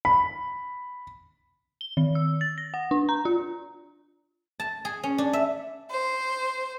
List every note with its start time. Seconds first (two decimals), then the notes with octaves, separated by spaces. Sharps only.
0.05 B5
1.81 G7
1.97 D#3
2.15 E6
2.41 A6
2.58 A#6
2.74 F#5
2.91 D4
3.09 A#5
3.25 F4
4.60 A5
4.85 G#4
5.03 C#4
5.18 D4
5.33 E5
5.90 C5